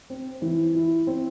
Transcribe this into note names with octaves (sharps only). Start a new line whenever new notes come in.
C4
E3
E4
C4